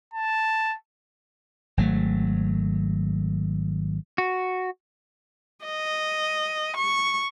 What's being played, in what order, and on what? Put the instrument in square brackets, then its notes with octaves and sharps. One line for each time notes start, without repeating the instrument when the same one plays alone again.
[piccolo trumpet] A5
[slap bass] G#1 F#3 A3
[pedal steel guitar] F#4
[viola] D#5
C#6